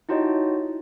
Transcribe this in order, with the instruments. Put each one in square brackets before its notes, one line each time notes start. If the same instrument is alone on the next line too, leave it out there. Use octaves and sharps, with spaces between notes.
[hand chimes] D#4 E4 F#4 G4 C#5 D#5